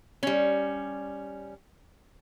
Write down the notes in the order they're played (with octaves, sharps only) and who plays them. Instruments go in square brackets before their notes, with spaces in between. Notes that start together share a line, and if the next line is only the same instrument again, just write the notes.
[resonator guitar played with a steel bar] G3 C#4